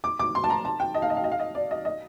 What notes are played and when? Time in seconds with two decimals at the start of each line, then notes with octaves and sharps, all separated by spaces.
0.04 D6
0.19 D6
0.35 C6
0.44 A5
0.50 A#5
0.65 A5
0.80 G5
0.94 D#5
1.02 F5
1.10 D#5
1.17 F5
1.24 D#5
1.32 F5
1.40 D#5
1.55 D5
1.71 D#5
1.85 D#5